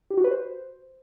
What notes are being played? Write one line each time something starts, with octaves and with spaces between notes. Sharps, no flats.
G4
F#4
B4
C5